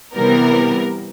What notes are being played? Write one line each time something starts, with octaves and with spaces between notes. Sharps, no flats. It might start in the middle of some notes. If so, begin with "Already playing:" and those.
C3 E3 G3 B3 A#4